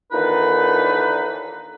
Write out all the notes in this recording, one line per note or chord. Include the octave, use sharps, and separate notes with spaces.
D#2 A#2 D3 E3 D#4 B4